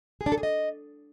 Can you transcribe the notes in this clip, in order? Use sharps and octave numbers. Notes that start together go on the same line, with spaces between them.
G#4
D4
A4
G#4
D#5